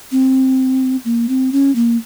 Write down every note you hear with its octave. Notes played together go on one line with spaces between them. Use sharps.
C4
A#3
C4
C#4
A#3